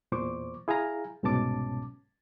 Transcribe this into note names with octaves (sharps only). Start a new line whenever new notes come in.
E2 A#2 C5 C#6 D6
E4 G#4 F5 G#5 A#5
C2 G#2 B2 C#4 A5 D6